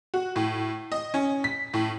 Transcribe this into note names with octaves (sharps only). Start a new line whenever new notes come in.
F#4
A2
D#5
C#4
B6
A2